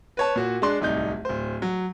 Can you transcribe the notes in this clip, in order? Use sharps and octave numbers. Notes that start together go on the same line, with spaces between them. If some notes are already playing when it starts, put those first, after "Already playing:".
B4 C#5 A5
A#2 F#4
G#3 D4 C6 F#6
D1 C2 D#4 G6
D1 C5
F#3